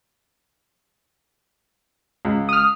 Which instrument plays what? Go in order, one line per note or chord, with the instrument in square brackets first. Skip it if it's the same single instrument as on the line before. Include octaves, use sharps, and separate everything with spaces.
[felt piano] C#2
[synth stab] D#6 F6